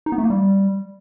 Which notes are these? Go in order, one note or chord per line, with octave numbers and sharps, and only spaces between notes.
D#4
B3
A3
A#3
G3